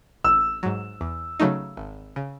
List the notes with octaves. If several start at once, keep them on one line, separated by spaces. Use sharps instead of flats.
A1 E6
G#2 F#3
E2
C#3 F#3 A3 D#4
G#1
C#3